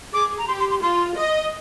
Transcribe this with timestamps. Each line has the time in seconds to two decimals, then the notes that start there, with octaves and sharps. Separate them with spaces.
0.14 G#4 D6
0.38 A#5
0.48 G4 C6
0.60 C6
0.71 C6
0.82 F4 C6
1.16 D#5